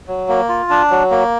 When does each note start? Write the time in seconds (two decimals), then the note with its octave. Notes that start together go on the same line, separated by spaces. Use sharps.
0.08 F#3
0.28 A#3
0.49 F4
0.70 D4
0.90 F#3
1.11 A#3